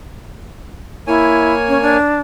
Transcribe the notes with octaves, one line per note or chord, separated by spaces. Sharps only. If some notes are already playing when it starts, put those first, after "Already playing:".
A#3 E4 C#5 G#5
C#4
D4